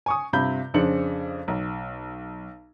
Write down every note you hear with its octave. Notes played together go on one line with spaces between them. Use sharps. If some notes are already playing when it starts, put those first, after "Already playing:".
G#5 C#6 D#6
G2 C3 F4 B5 G6
F2 C#3 D4 C5 C#7 F#7
B1